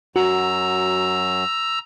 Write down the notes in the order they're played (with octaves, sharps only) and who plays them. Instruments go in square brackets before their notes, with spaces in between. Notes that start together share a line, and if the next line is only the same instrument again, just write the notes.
[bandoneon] F#2 F#3 [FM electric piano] F#4 [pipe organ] A#5 E6